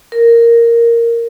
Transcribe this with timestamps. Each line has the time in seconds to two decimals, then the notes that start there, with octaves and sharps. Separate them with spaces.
0.12 A#4